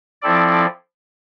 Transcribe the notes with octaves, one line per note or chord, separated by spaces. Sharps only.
F3 C4 E4 A4 D5